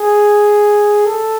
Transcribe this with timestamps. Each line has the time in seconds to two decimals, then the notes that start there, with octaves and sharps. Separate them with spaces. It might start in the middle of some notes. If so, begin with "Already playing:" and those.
Already playing: G#4
1.07 A4